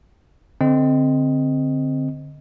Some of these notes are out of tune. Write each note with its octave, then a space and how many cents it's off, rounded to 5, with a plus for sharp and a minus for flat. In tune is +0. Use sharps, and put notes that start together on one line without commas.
D3 +0 C4 +0 D#5 +0